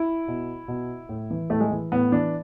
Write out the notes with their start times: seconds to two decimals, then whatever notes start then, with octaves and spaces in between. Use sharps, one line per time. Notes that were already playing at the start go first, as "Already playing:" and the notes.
Already playing: E4
0.28 B2
0.68 B2
1.09 A2
1.31 E3
1.50 A2 A3
1.60 G#3
1.71 E3
1.92 A2 B3
2.12 E3 D4